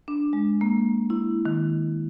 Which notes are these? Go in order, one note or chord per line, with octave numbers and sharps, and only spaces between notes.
D4
G#3
A#3
E4
D#3